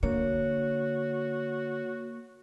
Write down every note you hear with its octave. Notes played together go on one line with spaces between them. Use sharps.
D3 A#3 F#4 C#5